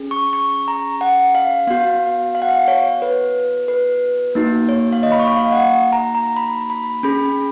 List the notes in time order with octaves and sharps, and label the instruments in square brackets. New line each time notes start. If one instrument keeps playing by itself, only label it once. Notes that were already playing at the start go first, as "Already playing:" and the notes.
Already playing: [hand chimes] C#4 G#4
C#6
C#6
A#5
F#5
F5
B3 F#4 F5
F5
F#5
F5
C#5
B4
B4
A#3 D#4 F#4
C#5
F5
D#5
B5
C#6
F5
F#5
A#5
A#5
B5
B5
C#4 G#4 B5